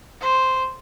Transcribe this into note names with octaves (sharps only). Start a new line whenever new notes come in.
C5